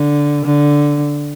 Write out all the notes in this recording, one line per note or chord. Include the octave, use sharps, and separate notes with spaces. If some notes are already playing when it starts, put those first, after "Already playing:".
Already playing: D3
D3